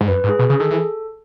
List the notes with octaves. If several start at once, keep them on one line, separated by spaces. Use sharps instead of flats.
G#2
F#2 B4
G#2
G#4
B2 G#4
C#3 G#4
D#3 A4
E3 A4